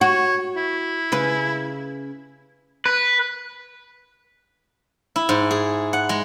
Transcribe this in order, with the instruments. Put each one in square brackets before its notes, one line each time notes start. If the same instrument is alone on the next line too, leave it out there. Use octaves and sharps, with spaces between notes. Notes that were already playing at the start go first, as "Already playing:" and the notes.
[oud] F#4 [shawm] C#5
[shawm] E4
[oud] C#3 B4
[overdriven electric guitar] B4
[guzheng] E4
G#2
G#4
F#5
G#3